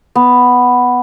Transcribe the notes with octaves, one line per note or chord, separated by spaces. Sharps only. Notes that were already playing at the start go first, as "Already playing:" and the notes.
B3